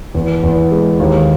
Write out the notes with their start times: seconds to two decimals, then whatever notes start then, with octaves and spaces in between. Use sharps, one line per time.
0.15 E2
0.43 E2
0.71 G#3
1.00 D#2